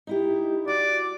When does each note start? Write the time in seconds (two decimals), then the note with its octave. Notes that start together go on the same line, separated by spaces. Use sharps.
0.07 D#4 E4 G4
0.68 F#4 D5